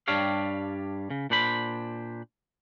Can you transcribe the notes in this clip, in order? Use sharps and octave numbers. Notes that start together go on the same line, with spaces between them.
G2 G3 D4 G4 C#5 F5
C#3
A#2 D4 C5 B5